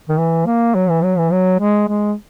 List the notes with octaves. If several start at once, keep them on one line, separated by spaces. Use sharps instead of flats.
D#3
E3
A#3
F#3
E3
F#3
E3
F#3
G#3
G#3